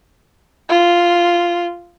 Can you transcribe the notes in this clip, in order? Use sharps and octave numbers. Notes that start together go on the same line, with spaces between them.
F4